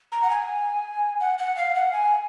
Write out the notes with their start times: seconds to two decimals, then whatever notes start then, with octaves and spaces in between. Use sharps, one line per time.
0.12 A#5
0.23 F#5
0.30 G#5
1.20 F#5
1.38 F#5
1.57 F5
1.75 F#5
1.93 G#5